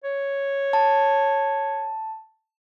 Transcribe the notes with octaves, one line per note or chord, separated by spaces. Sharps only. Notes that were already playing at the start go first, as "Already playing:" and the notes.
C#5
A5